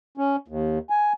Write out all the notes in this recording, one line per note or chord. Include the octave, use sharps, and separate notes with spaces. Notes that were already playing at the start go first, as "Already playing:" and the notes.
C#4
D#2
G#5